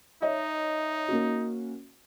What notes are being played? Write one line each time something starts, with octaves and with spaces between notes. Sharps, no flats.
D#4 C#5 D#5 E5
A#3 C#4 F#4